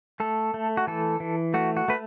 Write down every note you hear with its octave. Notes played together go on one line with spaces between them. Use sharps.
A3 A4
A3
F#4
E3 A4
E3
A3 F#4
F#4
A3 B4